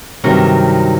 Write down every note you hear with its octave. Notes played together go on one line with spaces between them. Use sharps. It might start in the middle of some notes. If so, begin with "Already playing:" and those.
G2 C3 D#3 F#3